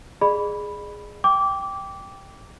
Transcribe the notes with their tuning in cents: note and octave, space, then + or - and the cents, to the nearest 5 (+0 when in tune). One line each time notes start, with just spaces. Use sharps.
G#4 +0 D5 +40 B5 +0
G5 +0 D6 -15